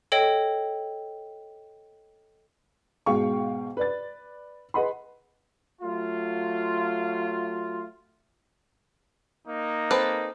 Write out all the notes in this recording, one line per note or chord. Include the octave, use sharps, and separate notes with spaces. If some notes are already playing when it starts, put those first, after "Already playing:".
A4 C#5 D#5 G5
G#2 B2 G#3 F5 G5 C#6
B4 D5 A6
G#4 B4 D#5 F#5 B5 C6
F#3 A3 F4
A#3 D#4
C4 A4 B4